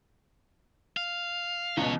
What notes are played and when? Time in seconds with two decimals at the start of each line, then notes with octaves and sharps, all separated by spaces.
0.97 F5
1.77 C#2 B2 E3 C#5